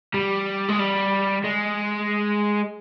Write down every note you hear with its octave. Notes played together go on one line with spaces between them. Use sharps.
G3
G#3
G3
G#3